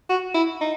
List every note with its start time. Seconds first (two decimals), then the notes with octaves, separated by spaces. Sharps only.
0.10 F#4
0.34 E4
0.61 D#4